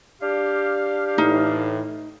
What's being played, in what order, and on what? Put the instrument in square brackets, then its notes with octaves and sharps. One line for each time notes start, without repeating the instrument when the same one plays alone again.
[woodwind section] D4 G4 F5
[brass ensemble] A2 E3 [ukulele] D#4